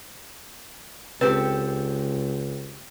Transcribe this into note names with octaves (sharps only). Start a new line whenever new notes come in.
C#2 C4 G4 A4 B4